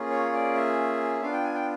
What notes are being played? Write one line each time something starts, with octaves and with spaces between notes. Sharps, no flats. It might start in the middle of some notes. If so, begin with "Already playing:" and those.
Already playing: A#3 C#4 F4 G#4
C#5
D5
E5
B3 D4 F4 F5
G5
G#5
G5